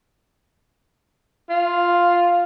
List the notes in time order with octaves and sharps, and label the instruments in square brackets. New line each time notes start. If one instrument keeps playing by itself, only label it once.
[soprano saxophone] F4